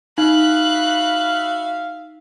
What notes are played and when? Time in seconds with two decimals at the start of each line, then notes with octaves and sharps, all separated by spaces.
0.18 D#4 F#4 E5 F5 B5 F#6